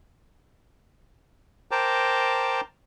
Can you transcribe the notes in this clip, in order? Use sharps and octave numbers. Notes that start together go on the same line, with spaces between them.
A#4 C5 G5 A5 A#5 D6